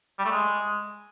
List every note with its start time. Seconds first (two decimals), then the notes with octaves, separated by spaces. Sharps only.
0.19 G3
0.25 A3
0.31 G#3